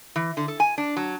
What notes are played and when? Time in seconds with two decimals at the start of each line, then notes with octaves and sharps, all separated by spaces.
0.16 E3
0.37 D3
0.48 A4
0.60 G#5
0.78 D4
0.97 F#3